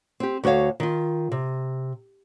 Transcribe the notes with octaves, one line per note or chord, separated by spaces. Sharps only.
C4 G4
D2 F#4 A#4 C#5 F5
D#3 F4
C3